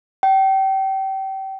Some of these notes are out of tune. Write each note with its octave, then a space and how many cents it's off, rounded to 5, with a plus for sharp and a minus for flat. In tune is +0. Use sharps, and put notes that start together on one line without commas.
G5 -30